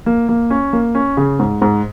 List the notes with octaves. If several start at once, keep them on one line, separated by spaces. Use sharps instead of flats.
A#3
A#3
C#4
A#3
C#4
C#3
G#2
G#2